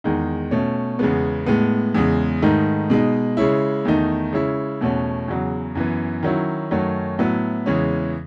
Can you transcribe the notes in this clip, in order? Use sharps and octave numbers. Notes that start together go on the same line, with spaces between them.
E2 D#3 G#3 D#4
B2 A3 C#4
E2 C#3 G#3 B3
A2 G#3 B3
E2 C#3 G#3
G#2 D#3 A3 D#4
B2 G#3 D#4
C#3 G#3 C#4 E4
E2 D#3 A3 D#4
C#3 G#3 C#4 E4
E2 B2 A3 C#4
E2 C#3 F#3
F#2 E3 B3
D#3 F#3 C#4 E4
F#2 D#3 F#3 A3 C#4
A2 F#3 B3 E4
E2 C#3 E3 G#3 C#4